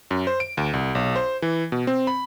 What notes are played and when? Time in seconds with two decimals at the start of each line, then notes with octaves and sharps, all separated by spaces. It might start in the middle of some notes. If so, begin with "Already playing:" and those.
0.11 F#2
0.27 C5
0.40 D7
0.57 D2
0.73 C2
0.95 B1
1.16 C5
1.42 E3
1.72 B2
1.87 C4
2.07 B5